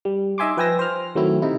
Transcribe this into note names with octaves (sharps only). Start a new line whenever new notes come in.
G3
D#4 D#5 E5 G#5 C6 D6
F3 B4 G5 G#5 E6 A#6
C5 F6
D#3 F#3 A3 C4 E4
C3 D#4 E4